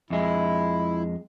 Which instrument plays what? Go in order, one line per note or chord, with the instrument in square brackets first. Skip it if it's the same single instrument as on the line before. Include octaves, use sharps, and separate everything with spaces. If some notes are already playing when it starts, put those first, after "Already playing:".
[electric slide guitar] F2 G#3 [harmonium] E4